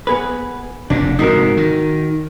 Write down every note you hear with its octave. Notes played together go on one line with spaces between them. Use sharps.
B3 G#4 B4
F1 A#2 D4
G#2 C3 D#4 F#4 A#4
D#3